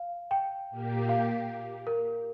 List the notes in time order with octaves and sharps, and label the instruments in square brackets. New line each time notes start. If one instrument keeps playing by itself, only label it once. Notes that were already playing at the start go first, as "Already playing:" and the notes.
Already playing: [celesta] F5
G5
[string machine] A#2 A#3 G4
[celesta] F5
A#4